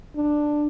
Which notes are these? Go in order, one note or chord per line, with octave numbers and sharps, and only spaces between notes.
D4